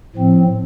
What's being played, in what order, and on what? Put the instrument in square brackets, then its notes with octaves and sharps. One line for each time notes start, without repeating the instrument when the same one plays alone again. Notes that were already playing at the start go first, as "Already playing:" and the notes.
[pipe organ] A2 F3 C4